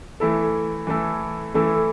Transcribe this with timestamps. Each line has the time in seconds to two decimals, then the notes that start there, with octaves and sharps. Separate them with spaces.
0.20 E3 A3 E4 A4
0.87 E3 A3 E4 A4
1.54 E3 A3 E4 A4